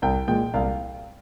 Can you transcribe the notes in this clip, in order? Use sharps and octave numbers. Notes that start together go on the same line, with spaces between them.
C2 G5
A#2 G#3 G5
C2 F5